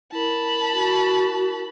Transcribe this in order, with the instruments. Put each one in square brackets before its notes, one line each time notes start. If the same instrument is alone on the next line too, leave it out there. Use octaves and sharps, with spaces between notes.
[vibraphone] E4 A#4 [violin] A5 B5
[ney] F#4